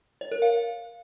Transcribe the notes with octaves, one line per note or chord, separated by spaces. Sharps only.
C#5
A#4
F5